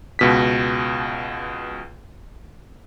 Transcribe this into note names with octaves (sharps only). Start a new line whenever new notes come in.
C#2 B2 B6